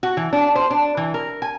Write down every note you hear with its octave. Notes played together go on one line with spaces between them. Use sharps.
F#4
E3
D4
C5
D4
E3
A#4
G#5